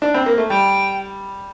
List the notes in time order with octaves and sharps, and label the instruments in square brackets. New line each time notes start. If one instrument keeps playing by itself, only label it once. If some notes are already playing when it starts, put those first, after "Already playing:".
[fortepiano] D4
C4
A#3
A3
[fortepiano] G3 [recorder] G5